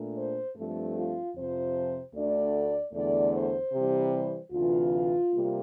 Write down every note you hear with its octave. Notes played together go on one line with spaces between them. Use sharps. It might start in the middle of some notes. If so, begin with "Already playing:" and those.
Already playing: A#2 A3 D4
C5
G2 F3 A3 C4 A4
F4
F2 C3 F3 C4 C5
D2 D3 A3 D4 D5
E2 D3 A3 D5
C5
C3 E3 G3
D2 C3 E3 F4
C3 G3 A#3